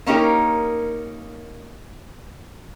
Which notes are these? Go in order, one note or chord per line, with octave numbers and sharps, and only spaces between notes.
A#3 C#4 D#4 G4 A#4